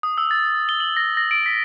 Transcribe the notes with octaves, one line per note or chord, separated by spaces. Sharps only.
D#6
E6
A6
G7
F#7
A#6
A#6
D7
B6